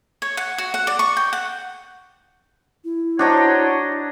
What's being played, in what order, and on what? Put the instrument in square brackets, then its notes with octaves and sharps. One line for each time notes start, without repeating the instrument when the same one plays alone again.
[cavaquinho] C#5
F#5
F#4
F#5
D5
C#6
G5
F#5
[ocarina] E4
[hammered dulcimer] D4 D#5 A#5 [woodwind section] F#4 C5 C#5